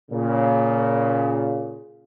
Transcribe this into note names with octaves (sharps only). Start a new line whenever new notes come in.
A#2 C#3